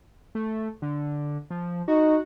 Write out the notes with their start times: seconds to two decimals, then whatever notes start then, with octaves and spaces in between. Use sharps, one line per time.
0.35 A3
0.82 D3
1.50 F3
1.88 D#4 F#4